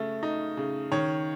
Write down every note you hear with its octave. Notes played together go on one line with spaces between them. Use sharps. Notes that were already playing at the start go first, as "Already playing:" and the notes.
Already playing: C#3 A3
D#4
C#3
D#3 C#5